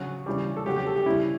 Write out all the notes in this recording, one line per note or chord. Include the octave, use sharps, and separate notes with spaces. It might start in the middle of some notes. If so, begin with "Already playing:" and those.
Already playing: C#3 F#3
C#3 E3 G3
A4
C#3 F#3 G4
G4
A4
G4
C#3 G3 E4